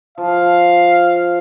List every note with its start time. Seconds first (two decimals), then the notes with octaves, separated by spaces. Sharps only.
0.18 F3 F5